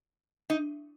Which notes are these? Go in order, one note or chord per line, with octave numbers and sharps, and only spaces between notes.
D#4